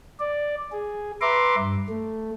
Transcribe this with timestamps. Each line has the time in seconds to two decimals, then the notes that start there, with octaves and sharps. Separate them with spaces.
0.20 D5
0.72 G#4
1.21 B4 E5 A#5 C6 D6
1.57 G2
1.89 A3